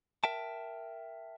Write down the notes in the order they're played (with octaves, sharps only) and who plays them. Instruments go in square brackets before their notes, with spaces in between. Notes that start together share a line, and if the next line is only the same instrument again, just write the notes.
[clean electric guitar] A#4 E5 G5 A5